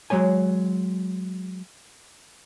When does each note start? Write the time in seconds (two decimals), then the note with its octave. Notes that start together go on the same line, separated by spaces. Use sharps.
0.10 F#3 G#3 C#5 G#5